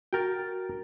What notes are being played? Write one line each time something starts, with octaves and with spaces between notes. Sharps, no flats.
F#4 A#4 G5 A6